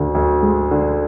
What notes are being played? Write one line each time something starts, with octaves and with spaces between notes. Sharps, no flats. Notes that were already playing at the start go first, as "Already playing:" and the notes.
Already playing: D2 D3
D2
G#3
D3